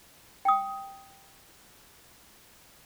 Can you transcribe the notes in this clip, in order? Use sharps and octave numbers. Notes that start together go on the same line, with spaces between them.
G5 D#6